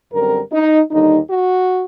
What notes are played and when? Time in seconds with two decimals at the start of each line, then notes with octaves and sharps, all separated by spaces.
0.12 F#2 D3 G3 C4 A#4
0.52 D#4
0.91 D#2 D3 G3 D#4
1.30 F#4